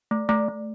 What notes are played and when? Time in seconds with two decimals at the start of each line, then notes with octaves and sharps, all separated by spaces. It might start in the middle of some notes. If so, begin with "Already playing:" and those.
0.11 A3
0.29 A3
0.48 A3